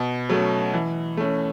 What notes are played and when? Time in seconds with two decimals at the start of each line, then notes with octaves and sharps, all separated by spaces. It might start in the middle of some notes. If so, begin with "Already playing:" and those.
Already playing: B2
0.29 F#3 A3 C#4
0.73 E3
1.17 A3 C#4